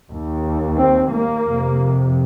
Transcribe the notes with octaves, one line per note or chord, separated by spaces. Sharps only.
D#2
C4
A#3
F2 C3